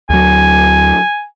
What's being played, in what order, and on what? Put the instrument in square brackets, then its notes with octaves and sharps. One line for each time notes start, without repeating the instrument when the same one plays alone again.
[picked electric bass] D2 F#3 [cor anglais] G#5